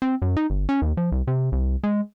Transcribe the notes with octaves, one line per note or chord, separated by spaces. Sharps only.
C4
F#2
D#4
G1
C#4
D#2
F3
C2
C3
C2
G#3